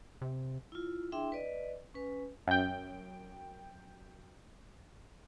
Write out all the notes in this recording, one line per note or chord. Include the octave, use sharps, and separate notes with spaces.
C3
E4 F4
D4 E4 G#4 E5 G5 C6
B4 D5 D#5
C#4 B4 G#5
F#2 G5